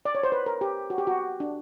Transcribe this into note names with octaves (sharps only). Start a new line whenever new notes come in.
D5
C#5
C5
B4
A#4
G4
F#4
G4
F#4
D4